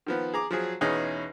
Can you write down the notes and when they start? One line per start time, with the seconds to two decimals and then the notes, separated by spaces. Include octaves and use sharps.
0.06 D#3 F3 B3
0.34 G#4 A#5 D6
0.51 F3 F#3 G#4
0.81 E2 B2 C#4 D#4 G#4